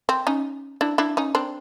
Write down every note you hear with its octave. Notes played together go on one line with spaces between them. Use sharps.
C4
C#4 D#4
D4 E4
D4 E4
C#4 D#4
C4 D4